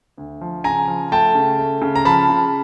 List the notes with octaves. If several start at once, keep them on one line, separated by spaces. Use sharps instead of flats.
D2
F3
C#3 G#5 A#5
F3
A3 G5 A5
C#3
A3
C#3
A#5
F3 A5 B5
C#3